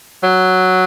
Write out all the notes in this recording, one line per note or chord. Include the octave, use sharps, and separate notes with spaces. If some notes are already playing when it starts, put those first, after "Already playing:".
F#3